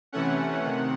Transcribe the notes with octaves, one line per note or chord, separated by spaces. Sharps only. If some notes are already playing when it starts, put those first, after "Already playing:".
C3 E3 A3 C#4 F#5
C3 D#3